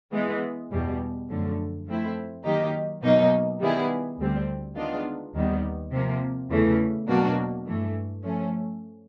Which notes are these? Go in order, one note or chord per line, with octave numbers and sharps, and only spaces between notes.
E3 G#3 B3
E2 B2 G3
F#2 D3 F3 A3
F3 A3 C4 E4
D#3 F#3 A#3 D#4 G4
B2 F#3 A#3 D#4
D#3 G3 B3 E4 G#4
D2 D3 G3 C4
D#3 G#3 B3 D4 F4
D#2 D#3 G3 B3
C3 F3 A#3
E2 C#3 E3 A3
B2 F#3 A#3 D4 F#4
G2 E3 A3
F3 A3 C#4